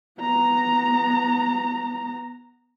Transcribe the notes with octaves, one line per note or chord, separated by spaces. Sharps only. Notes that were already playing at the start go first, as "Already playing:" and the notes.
B3 A#5